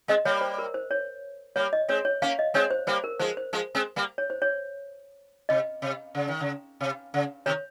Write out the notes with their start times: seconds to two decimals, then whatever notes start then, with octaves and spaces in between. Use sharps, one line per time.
0.08 G#3 C4 D#5
0.25 G3 A#3 C#5
0.41 C5
0.59 A#4
0.74 C5
0.91 C#5
1.56 G3 A#3 C#5
1.73 D#5
1.88 G#3 C4 C#5
2.05 C#5
2.22 A#3 C#4 F5
2.39 D#5
2.54 G#3 C4 C#5
2.71 C5
2.87 G3 A#3 C5
3.04 A#4
3.19 F3 G#3 C5
3.37 C5
3.53 F3 G#3
3.75 G#3 C4
3.96 G3 A#3
4.18 C#5
4.30 C5
4.42 C#5
5.49 C3 D#5
5.82 C3
6.15 C#3
6.28 D#3
6.40 C#3
6.81 C3
7.14 C#3
7.46 C3 D#3 C#5